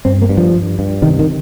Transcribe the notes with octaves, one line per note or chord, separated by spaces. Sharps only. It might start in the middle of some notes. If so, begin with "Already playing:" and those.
G2 C4
A#3
G2
F3
G2
G2
C3 D#3
D#3